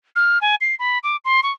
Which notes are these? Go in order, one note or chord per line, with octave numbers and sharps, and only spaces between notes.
F6
G#5
C7
B5
D6
C6
C#6